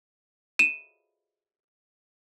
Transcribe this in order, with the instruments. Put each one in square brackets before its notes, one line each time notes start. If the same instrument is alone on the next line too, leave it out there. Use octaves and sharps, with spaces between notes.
[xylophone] D#7 E7